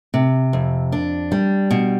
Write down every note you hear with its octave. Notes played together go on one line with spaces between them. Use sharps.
C3
F2
D4
G3
B2